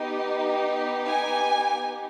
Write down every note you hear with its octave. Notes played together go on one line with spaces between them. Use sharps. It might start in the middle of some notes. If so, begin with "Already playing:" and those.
Already playing: B3 D#4 G4
G#5